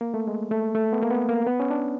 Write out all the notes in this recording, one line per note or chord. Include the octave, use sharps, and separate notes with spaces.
A#3
A3
G#3
A3
A3
B3
A#3
B3
A#3
B3
C#4
D4